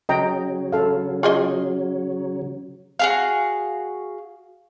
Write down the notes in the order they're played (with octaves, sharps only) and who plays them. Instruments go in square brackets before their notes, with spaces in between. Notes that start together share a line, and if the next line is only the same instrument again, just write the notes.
[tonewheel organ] C#3 F#3 [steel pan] D#5 G5 A#5
[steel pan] A4 F5
[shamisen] F4 G#4 D#5
[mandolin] F#4 G#4 F5